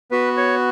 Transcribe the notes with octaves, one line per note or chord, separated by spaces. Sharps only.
B3 F#4 B4
C#5